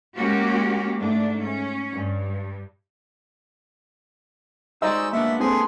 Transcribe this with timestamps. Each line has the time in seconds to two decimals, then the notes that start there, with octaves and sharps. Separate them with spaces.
0.15 G#3 A#3 C#4 F#4 G4
0.98 G#2 A3 D4
1.42 C#4
1.91 G2
4.82 G#3 D#4 F#4 C5 D5 D#5 G#5 E6
5.13 A#3 B3 D4 E5
5.40 C4 G#4 A4 C5